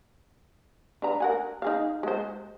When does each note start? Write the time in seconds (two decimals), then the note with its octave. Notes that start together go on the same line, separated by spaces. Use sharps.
1.02 D4 B4 A#5
1.20 A#4 F#5 G#5
1.62 D#4 G#4 F5
2.03 G#3 C5